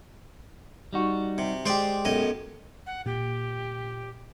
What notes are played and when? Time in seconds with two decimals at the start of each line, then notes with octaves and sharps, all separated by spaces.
0.93 G3 D#4 F#4
1.38 C3
1.66 G#3 G4 C5 D5
2.05 B1 F#2 D#5
2.86 F#5
3.06 A#2 G4